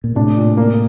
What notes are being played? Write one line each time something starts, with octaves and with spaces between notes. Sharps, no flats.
A#2
A2 C3 D4
A#2
A#3